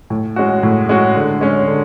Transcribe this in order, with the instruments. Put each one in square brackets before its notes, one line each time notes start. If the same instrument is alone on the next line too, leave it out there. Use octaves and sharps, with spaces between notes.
[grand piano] A2
G#3 C#4 F#4
A2
G#3 C#4 F#4
D3
G#3 C#4
D3